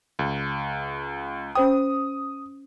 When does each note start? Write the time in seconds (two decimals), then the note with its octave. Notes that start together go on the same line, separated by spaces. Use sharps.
0.19 C#2
1.55 C#4 C5 G5 D#6